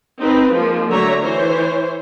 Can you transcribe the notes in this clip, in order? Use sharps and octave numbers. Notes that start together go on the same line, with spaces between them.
C4 D#4 B4
F3 G#3 A#3
D3 F#3 A3 C#5 E5 A#5
E3 C5 C#5